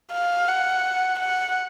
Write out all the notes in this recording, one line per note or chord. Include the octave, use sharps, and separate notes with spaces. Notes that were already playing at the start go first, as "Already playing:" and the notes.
F5
F#5
F#5